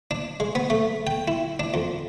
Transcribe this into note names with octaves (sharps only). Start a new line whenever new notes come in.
D4
G#3
B3
A3
G5
E4
D4
F2